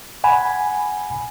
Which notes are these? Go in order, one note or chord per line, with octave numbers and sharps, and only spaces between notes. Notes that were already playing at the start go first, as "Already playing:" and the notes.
F#5 G#5 B5